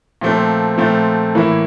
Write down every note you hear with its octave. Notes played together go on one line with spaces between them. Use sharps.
A#2 F3 A3 C4
A#2 F3 A3 C4
A2 E3 A#3 E4